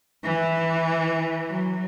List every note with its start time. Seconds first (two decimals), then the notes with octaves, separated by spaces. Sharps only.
0.24 E3
1.49 F#3